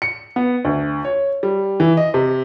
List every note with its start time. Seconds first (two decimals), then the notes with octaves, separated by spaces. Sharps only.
0.02 C#7
0.36 B3
0.65 D2
1.04 C#5
1.43 G3
1.80 E3
1.97 D#5
2.14 C3